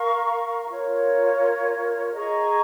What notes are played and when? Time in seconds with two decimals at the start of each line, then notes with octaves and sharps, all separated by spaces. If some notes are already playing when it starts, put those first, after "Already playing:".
Already playing: A#4 F5 A#5 C#6
0.68 F4 A#4 C#5
2.13 G#4 D#5 A#5 C#6